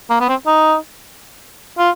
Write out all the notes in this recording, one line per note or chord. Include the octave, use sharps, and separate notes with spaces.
A#3
B3
C4
D#4
F4